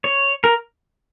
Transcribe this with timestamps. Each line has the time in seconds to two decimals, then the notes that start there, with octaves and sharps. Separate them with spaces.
0.04 C#5
0.44 A#4